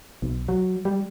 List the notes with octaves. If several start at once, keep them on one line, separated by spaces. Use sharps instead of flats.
B1
F#3
G3